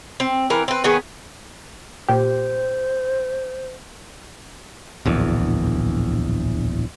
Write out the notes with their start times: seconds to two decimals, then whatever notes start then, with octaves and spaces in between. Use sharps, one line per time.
0.20 C4
0.50 E3 C4 A#4
0.68 C4 B4
0.84 D#3 B3 C#4 G#4
2.09 A#2 G4 C5
5.05 D1 A#1 E2